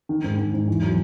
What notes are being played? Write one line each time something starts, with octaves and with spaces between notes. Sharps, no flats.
D#3
G#2
D#3
G#2
E2
F#3